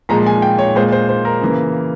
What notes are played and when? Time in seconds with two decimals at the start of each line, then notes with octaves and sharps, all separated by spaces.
0.09 A#2 F3 G#3 A#5
0.27 G#5
0.42 G5
0.59 C#5
0.75 A#2 G#3 C5
0.92 C5
1.09 C5
1.25 A#4
1.41 C#3 E3 A#3